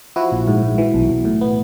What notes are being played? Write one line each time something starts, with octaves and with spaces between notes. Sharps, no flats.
F3 E4 F#4
A#1
G#2
G#2
E3
B1
B1
A2
B3